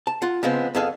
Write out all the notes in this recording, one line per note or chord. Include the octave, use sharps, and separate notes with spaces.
A5
F4 F#5
C#3 F3 G#3 B3 C4
F2 B3 G#4 A4 F5